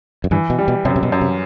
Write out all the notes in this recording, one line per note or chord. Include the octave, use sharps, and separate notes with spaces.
F#2
G2 E3
B2
G3
B2
F#2 C3
C3
B2
F#2
C3